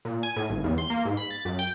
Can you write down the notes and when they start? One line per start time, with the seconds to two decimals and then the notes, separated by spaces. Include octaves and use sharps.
0.05 A#2
0.23 G#5
0.36 A2
0.50 G#1
0.64 E2
0.78 C6
0.90 A#3
1.05 G#2
1.17 B5
1.31 A6
1.45 F#2
1.59 G5